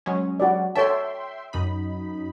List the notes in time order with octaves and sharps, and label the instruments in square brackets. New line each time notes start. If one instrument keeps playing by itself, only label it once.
[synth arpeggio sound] F#3 G#3 C#4
[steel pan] F#4 D5
[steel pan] A4 C#5 A5 [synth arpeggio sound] E5 G5 C6
[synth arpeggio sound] F#2 D#4 B5